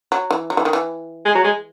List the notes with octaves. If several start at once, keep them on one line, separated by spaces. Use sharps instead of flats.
F#3
E3
F#3
E3
D#3
E3
G#3
F#3
G#3